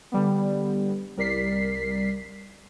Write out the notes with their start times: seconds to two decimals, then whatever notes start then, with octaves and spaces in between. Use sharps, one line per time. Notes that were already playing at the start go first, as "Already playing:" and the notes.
0.12 D3 G3 B3
1.17 C2 G3 A#4 D5 B6 C7